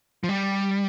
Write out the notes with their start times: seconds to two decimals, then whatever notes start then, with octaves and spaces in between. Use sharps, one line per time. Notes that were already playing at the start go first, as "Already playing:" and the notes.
0.24 F3
0.29 G3